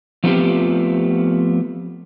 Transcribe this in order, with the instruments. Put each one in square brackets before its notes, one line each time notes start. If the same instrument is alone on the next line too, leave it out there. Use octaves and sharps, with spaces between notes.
[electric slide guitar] F3 A3 B3 C4 F4 G4